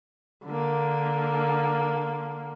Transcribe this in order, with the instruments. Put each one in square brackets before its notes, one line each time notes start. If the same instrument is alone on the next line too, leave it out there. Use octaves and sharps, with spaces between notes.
[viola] D3 A#3